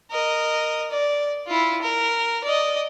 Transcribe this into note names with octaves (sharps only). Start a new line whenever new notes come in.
A#4 D#5
D5
E4 F4
A#4
D5 D#5